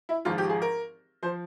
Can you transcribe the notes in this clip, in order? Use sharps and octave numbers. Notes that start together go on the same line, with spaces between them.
E4
G#1 G#2 F3 F4
G4
G#4
A#4
F3 C5